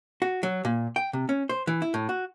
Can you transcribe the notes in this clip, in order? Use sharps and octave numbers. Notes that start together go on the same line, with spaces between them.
F#4
F#3
A#2
G5
C3
C#4
C5
E3
E4
A2
F#4